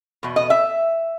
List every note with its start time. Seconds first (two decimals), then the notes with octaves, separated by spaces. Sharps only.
0.23 E2 B2
0.36 D#5
0.50 E5